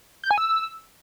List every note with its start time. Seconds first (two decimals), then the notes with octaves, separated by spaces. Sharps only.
0.24 G6
0.31 G#5
0.38 E6